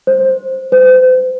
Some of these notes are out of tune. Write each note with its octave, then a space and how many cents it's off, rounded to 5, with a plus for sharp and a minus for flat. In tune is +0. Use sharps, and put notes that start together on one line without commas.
C5 +10
C5 -40